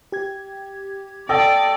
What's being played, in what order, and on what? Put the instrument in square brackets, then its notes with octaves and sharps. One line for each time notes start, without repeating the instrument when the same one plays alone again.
[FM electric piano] G4 G#6
[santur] A4 D#5 [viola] D5 [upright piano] G5